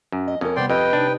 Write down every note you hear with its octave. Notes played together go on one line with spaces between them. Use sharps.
F#2
D#5
F2 C#4 A#4
C3 G3 B3 D5 G5 C6
F2 G4 B4 D#5 G5
C3 D4 D#4